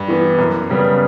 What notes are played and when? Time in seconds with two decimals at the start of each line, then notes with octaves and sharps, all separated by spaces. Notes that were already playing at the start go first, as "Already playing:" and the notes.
Already playing: G2
0.09 E3 B3
0.39 F#2
0.70 C#3 G3 B3